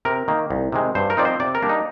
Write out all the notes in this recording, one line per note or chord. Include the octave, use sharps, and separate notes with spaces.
C3 A#4
D#3 A#3
C2
C3 D#3 G#3
G2 C5
A#4
F3 C4 D#4 D5
C5
C3 D5
A#4
G3 A#3 D4
D#4